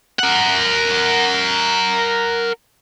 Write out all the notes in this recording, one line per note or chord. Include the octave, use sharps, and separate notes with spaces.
A#4 F#5